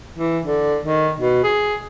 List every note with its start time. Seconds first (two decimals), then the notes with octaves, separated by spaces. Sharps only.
0.18 E3
0.46 D3
0.84 D#3
1.19 B2
1.44 G#4